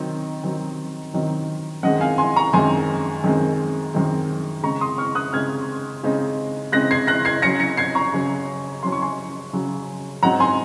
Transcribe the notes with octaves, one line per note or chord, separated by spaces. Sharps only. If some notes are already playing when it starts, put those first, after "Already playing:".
Already playing: D#3 F#3 C4 D#4
D#3 F#3 C4 D#4
D#3 F#3 C4 D#4
F#2 D#3 G#3 C4 D#5 F#5
F5 G#5
G#5 C6
A#5 C#6
F#2 D#3 G#3 C4 G#5 C6
F#2 D#3 G#3 C4
F#2 D#3 G#3 C4
C#3 G#3 C4 D#4 A#5 C#6
C6 D#6
C#6 F6
D#6 F#6
C#3 G#3 C4 D#4 F6 G#6
C#3 G#3 C4 D#4
C#3 G#3 C4 D#4 F#6 A#6
G#6 C7
F#6 A#6
G#6 C7
C#3 F#3 C#4 A#6 C#7
A#6 C#7
G#6 C7
A#5 C#6
C#3 F#3 C#4
C#3 F#3 C#4 C6
C#6
G#5 C6
C#3 F#3 C#4
G#2 F#3 C4 D#4 F#5 A#5
G#5 C6